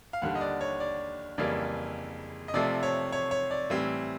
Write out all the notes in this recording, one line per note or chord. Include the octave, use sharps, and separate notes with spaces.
F5
D#2 D3 G3 F#5
D#5
D5
C#5
D5
F2 C#3 E3 G3 A#3 D5
D#5
C3 F3 A3 C4 D5
C#5
C#5
C#5
D5
A2 E3 G3 C4